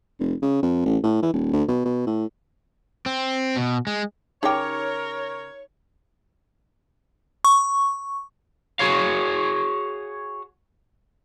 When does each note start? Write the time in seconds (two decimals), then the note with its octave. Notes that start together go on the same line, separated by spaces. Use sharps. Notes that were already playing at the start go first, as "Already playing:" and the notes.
0.20 F1
0.42 C#3
0.62 F2
0.85 A1
1.03 A2
1.22 E3
1.33 D#1
1.53 D2
1.68 B2
1.85 B2
2.07 A2
3.06 C4
3.56 B2
3.87 G#3
4.43 C#3 D#4 G4 A#4 C#5 G5 D6
7.45 C#6
8.79 F#4 G#4 C#5 F5